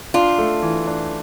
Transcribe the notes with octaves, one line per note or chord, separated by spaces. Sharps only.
D4 F4
A3
E3
D4